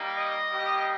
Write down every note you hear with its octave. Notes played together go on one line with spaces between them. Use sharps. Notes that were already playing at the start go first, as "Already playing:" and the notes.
Already playing: G3 A#3 D#4
D#5
G3 A#3 G4